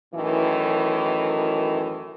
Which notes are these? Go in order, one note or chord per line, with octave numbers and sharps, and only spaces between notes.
F#2 A2 D#3 E3